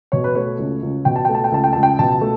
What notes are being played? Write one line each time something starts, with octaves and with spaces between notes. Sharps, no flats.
B2 C#5
B4
A3 C#5
C#2
C#2
B2 G5
A5
A3 G5
A5
G5
C#2 A5
G5
C#2 A5
G5
B2 A5
A3